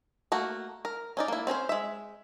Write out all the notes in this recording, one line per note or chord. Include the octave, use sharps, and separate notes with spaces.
A3 A#3 F#4
A#4
C#4 D#4 D5
A#3 E4
C4 C#4 A#4 C5
G#3 E5